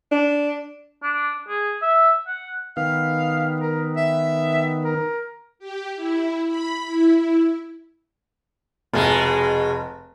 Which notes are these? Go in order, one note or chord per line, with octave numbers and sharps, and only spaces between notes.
D4
D4
G#4
E5
F#5
D#3 B3 F5
A#4
E5
A#4
G4
E4
B5
E4
F1 B2 G#3